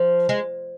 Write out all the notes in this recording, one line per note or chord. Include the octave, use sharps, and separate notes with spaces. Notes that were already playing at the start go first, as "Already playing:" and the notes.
Already playing: F3
G#3